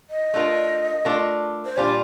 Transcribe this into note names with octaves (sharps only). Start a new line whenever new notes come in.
D#5
A3 D4 F4 A#4
A3 D4 F4 A#4
C5
A#2 G3 D4 F4 D5